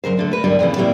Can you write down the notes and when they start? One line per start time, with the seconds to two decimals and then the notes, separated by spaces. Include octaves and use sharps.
0.04 F#2 C#3 A#4 C5
0.17 D#2 D3 A3
0.31 A#4 B4
0.44 G2 D3 G3
0.59 F2 A#2 C#3 E3
0.76 A2 C#3 G3 A#3 C4 E4